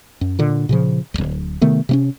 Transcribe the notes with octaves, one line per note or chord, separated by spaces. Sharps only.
F#2
A#2 D3
A#2 C#3 F3
D1 C2
C3 D#3 A3 B3
C3 A#3 C#4